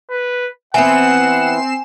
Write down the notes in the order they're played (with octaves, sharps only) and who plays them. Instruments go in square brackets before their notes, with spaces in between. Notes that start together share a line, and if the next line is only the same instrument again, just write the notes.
[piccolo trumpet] B4
[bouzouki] E3 B3 [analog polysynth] C4 C7 E7 [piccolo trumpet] F#5 [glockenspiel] G#5